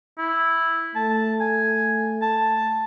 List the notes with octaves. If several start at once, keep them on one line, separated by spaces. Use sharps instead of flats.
E4
A3 A5
G#5
A5